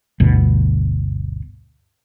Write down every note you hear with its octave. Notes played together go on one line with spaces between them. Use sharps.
G1 D2 B2